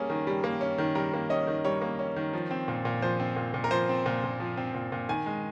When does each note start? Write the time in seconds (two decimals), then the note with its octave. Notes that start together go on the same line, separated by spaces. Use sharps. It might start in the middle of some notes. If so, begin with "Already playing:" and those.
Already playing: G3 A#3 C#4 G#4
0.10 D#3
0.27 G3
0.44 A#3
0.61 C#4
0.78 D#3
0.95 G3 A#4
1.13 A#3
1.30 C#4 D#5
1.47 D#3
1.65 G3 C#5
1.82 A#3
1.99 C#4
2.16 D#3
2.33 F3
2.51 C4
2.68 A#2
2.85 A#2
3.02 F3 C5
3.20 C4
3.36 A#2
3.54 A#2
3.64 A#4
3.71 F3 C5
3.89 C4
4.06 A#2
4.24 A#2
4.40 F3
4.57 C4
4.75 A#2
4.92 A#2
5.09 D#3 G#5
5.26 G#3